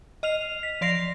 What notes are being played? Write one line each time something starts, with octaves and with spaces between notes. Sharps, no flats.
D#5 F6 C7 F7
B6
F3 D5 C6 A#6 C7 F7